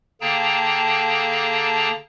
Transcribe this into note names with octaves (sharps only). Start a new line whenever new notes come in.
D3 A#3 G#4 G5 A5 A#5